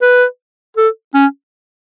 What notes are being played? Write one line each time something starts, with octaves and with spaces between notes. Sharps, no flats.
B4
A4
C#4